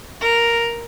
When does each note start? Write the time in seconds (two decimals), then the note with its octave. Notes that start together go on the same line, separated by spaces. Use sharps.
0.21 A#4